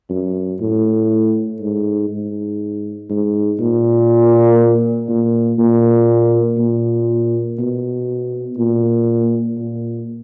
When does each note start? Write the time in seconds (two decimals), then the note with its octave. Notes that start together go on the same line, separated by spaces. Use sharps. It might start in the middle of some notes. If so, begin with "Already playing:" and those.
0.10 F#2
0.61 A2
1.61 G#2
2.09 G#2
3.10 G#2
3.60 A#2
5.09 A#2
5.59 A#2
6.58 A#2
7.59 B2
8.58 A#2
9.58 A#2